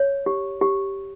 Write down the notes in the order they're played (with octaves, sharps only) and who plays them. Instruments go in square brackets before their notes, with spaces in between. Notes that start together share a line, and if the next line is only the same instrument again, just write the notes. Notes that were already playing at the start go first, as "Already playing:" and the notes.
Already playing: [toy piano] C#5
G4
G4